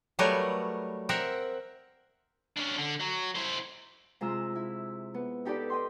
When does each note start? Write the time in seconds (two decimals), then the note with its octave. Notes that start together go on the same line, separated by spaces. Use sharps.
0.19 F#3 G3 A3 A#4 B4 C#5
1.09 C4 A#4 E5 F#5
2.57 C#4 D4
2.78 D3
3.01 F#3
3.35 E4 C5
4.21 C3 G#3 F4 A#5 E6
4.55 E4
5.14 B3
5.45 D#4 G4 A4 B4 D5
5.70 D#5 G5 C6